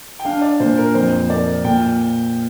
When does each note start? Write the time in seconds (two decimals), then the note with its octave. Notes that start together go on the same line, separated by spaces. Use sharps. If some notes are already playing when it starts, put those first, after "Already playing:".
0.19 G5
0.25 D4 F5
0.42 D5
0.60 A#2 C5
0.78 A#4
0.94 F2 C5
1.30 A#3 D5
1.65 A#2 G5